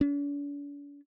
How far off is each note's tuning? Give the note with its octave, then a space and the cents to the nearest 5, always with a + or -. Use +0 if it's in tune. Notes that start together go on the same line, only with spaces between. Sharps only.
D4 -45